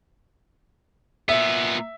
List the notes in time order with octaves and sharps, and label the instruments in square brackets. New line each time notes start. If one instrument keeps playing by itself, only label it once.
[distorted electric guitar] A#2 B3 [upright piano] E5